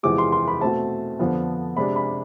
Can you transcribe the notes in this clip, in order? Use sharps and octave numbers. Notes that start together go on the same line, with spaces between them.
E2 C3 F3 G#3 D6
C6
C6
B5
B2 A3 C4 A5
F2 D3 F3 B3
C3 G#3 D4 B5
B5